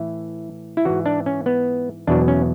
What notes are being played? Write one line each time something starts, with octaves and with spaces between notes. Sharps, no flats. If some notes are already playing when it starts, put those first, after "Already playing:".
Already playing: A2 E3 E4
E4
G#2 E3 F#4
D4
C#4
B3
E2 B2 F#3 D4
C#4